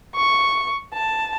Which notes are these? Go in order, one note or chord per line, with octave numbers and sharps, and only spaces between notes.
C#6
A5